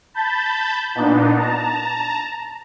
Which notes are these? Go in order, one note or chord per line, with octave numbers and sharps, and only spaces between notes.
A5 B5 G6 A6
A#2 B3 D4 D#4
A5 A#5